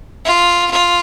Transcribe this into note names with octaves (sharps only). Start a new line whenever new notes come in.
F4
F4